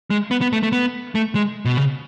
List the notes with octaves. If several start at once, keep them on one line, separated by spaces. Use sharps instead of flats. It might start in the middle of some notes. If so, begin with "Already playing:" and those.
G#3
B3
B3
A3
A3
B3
A3
G#3
B2
C#3